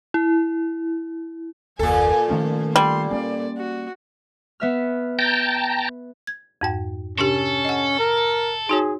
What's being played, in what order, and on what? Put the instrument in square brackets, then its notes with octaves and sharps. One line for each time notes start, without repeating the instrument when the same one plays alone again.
[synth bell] E4
[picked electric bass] F#1 D#2 [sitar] A#2 A4 [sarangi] G#5
[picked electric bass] D#3 A3 C#4 [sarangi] F3
[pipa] G3 [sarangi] C6
[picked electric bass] A#3 B3 C#4 [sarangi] D5
[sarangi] F#4
[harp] B3 E5 F6
[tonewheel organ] G5 A5 A#5
[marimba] G#6
F2 G#2 G5
[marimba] C3 D4 G4 [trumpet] C#4 [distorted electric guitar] A4
[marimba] D#5 F#5
[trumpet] A#4
[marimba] D#4 F#4 C#5 [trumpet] G#4